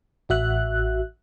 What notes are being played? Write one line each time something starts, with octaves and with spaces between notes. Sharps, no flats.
A1 F#4 E5 F#6